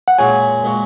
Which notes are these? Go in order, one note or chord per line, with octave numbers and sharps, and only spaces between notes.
F#5
A#2 G#3 F#4 C#5 G#5
A#2 G#3 F#4 C#5